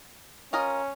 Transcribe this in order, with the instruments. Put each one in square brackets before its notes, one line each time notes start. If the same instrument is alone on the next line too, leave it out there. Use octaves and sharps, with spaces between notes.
[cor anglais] C#4 [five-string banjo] F4 A#4 D#5